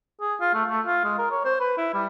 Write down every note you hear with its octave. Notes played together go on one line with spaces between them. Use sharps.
G#4
F4
A3
A3
F4
G#3
A#4
C#5
C5
B4
E4
G3